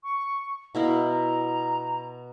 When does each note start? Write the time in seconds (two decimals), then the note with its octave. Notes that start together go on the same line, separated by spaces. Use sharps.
0.03 C#6
0.75 B2 E4 A#4 F5
1.08 A#5